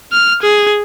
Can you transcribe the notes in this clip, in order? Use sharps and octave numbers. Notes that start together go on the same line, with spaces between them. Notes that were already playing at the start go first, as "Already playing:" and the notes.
F6
G#4